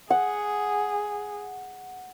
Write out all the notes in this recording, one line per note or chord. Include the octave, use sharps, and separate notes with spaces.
G#4 F#5